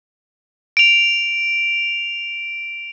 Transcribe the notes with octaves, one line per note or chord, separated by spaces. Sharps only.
D7 F7